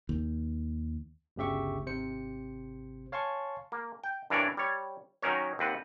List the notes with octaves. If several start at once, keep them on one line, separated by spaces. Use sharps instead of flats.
D#2
G1 D2 C#3 G4 E5 C#6
G#1 C3 C5 C#7
C#5 F5 G#5 A5 C6 C#6
A#3
G5
G2 E3 D4 A#4 C#5 D5
G3 C#5
D#3 F#3 C#4 D#4 A#4 C#5
D#2 C4 B4 F#5